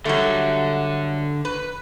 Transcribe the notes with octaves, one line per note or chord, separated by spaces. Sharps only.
D3 F#3 G3 A3
B4